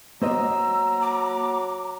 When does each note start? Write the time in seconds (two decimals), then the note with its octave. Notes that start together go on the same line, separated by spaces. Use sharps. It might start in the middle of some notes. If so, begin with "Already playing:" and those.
0.22 F#3 A#3 C5 D#5 A#5 E6
1.01 D6